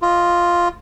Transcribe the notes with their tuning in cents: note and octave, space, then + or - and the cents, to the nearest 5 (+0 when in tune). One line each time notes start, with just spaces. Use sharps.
F4 +0 D#5 +0